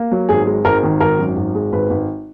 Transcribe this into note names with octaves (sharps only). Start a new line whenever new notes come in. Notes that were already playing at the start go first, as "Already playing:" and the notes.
Already playing: A#3
F#3
G#1 G#4
G#3
G#1 A#4
D#3
G#1 A#4
F#2
G#1
G#3
G#1 B4
G#1